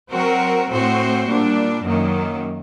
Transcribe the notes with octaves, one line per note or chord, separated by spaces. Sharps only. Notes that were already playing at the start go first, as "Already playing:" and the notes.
F#3 C4 F#4 A#4
A2 A3 C4 F#4 C5
A#2 G3 D4
F#2 D#3 F#3 A#3